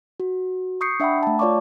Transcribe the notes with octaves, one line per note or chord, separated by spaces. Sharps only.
F#4
C#6 D#6 G6 C7 C#7
D4 E5 F#5 G5 B5
A3 A5
F4 C#5 D5 F5 C#6 D6